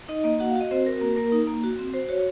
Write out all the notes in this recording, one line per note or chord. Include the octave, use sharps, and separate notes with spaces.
D#4 D#5
A#3 D#5
F#4 F#5
F5
F#4
D#5
C4 C5
F#4 A#4
A#3 A#4
A#3 A#4
D#4
A#3
F#4
C4
F#4 C5
F#4 C#5